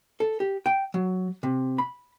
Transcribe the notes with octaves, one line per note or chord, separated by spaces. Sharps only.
A4
G4
G5
F#3
C3
B5